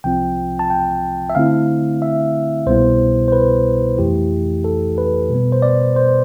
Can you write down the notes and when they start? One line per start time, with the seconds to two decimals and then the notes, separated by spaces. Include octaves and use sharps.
0.04 C2 C3 F3 C4 F4 G5
0.59 A5
0.70 G5
1.30 E5
1.35 D3 A3 C4 E4 F5
2.02 E5
2.67 C2 B2 G3 B3 E4 C5
3.28 C5
3.32 B4
3.98 F2 E3 A3 E4 G4
4.64 A4
4.98 B4
5.30 B2 G3 B3
5.52 C5
5.62 D5
5.96 C5